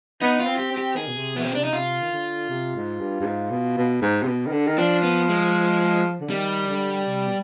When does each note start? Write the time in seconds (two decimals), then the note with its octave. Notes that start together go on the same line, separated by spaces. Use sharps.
0.22 B3 D#4
0.40 F4
0.47 C4
0.59 G4
0.72 C4
0.78 G4
0.97 D#3 G#4
1.08 B2
1.17 C3
1.35 B2 B3
1.45 C4
1.55 C3 D4
1.64 D#4
1.73 C3 F4
2.02 D#3
2.11 D3
2.49 C3
2.75 G#2
3.00 G2
3.21 G2
3.26 G#2
3.51 B2
3.77 B2
4.02 G#2
4.22 C3
4.28 B2
4.47 D#3
4.52 D3
4.67 D#3
4.78 F3 D4
5.03 B3
5.29 G#3
6.21 D3
6.30 D#3 G3
6.68 D3
7.06 C3
7.27 B2